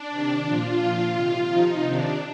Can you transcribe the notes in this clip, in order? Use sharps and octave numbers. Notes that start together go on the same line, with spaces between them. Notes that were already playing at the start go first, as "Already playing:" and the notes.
Already playing: D4
C3 D#3
A#2 F3 F4
A#2 F3
C3 D#3
C3 F3 D#4
C3 D#3 D4